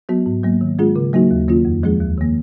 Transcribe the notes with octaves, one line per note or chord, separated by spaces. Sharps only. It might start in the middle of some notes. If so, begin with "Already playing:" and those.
F#3 B3 F#4
G#2
F#3 A#3
D#3
G#3 C#4 F4 G#4
C#3
F#3 A#3 D#4 F#4
D#2
D#3 A#3 C#4 F4
F2
F3 G#3 C#4 G#4
D#2
D#3 A#3